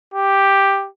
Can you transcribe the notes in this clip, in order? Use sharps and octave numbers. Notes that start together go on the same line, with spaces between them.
G4